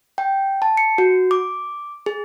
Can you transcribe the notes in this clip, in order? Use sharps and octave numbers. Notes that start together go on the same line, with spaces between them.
G5
A5
C#7
F#4
D6
G#4